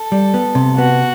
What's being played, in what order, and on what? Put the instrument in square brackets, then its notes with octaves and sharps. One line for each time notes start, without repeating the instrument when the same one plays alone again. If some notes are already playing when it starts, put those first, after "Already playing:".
Already playing: [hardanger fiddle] A4
[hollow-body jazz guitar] G3
B3
C3
[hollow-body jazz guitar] B3 [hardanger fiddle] F#4